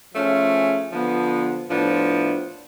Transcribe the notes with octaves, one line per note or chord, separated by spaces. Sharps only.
F3 A3 C#4 G#4
D3 F3 B3
A2 F3 B3 D4